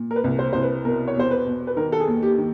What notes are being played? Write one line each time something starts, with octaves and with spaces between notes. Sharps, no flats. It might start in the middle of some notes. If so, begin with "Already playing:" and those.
Already playing: A#2
A#4
B4
C2
C5
C2 C5
B4
B2 A#4
C#5
E2 C5
B4
B2
B4
D#3 A#4
A4
G#4
D#2
G4
D#3